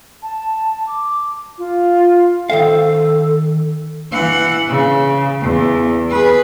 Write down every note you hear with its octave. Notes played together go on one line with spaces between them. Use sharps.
A5
D6
F4
D#3 A4 C5 F5
E3 F#5
C#3
E2
G#4 B4